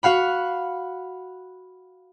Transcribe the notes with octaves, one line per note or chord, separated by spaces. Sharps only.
F#4 F5 F#5 B5